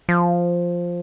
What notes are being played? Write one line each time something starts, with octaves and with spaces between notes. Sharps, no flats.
F3